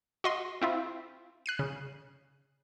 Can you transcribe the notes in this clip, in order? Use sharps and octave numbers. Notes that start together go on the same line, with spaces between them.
F#4 D#5 C6
C4 E4 F4
F#6 C7 D#7
C#3